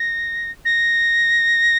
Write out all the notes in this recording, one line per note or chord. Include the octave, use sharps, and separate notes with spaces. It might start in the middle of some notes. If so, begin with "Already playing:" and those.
Already playing: A#6
A#6